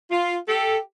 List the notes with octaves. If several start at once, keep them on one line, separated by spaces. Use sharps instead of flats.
F4
G4 A4